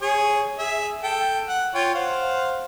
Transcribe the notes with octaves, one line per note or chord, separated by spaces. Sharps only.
G#4 C#5 G#5
G#4 E5
A4 G5
F#5
F4 C#5 G5
C5 F5 F#5